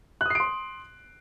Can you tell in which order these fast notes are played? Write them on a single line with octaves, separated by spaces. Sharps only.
F#6 D#6 C7 D7 C6